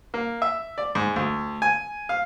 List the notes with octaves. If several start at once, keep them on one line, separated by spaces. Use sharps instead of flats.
A#3
E5
D5
G#2
D2
G#5
F5